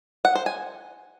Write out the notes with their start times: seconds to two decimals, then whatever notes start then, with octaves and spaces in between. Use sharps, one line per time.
0.25 F#5
0.35 C5
0.46 G#5